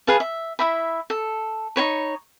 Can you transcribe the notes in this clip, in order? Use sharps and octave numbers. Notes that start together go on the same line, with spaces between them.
G#4 B4 F5 A5
E5
E4 E5 B5
A4
D#4 F4 C#5 B5